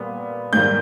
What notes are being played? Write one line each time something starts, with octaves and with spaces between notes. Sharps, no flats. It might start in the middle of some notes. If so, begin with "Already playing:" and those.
Already playing: A#2 G3 B3
G#2 D#3 G3 A#3 G6